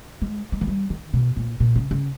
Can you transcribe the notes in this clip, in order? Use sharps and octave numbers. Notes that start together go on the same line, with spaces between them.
G#3
G#3
E3
G3
D#3
B2
A#2
A#2
C#3
C#3